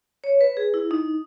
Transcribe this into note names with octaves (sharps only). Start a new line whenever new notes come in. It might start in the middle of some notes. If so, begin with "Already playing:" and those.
C#5
B4
G#4
E4
D#4